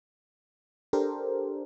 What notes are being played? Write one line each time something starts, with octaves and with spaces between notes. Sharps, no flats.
D4 G4 A4 A#4 C5